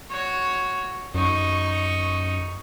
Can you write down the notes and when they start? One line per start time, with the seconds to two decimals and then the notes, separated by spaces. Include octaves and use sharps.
0.10 F#4 C#5
1.15 F#2 D#4 C#6